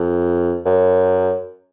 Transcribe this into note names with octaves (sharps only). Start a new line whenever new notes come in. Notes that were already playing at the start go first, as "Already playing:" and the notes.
Already playing: F2
F#2